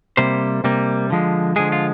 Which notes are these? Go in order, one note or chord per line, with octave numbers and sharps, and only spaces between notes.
C3 G3 A#3 C5
C3 G3 A#3
D3 F3 G#3
D3 F3 G#3 G#4
F4